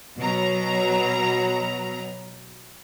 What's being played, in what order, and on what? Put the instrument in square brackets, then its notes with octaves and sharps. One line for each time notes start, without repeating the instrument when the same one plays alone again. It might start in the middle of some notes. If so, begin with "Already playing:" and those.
[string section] B2 F#3 A#5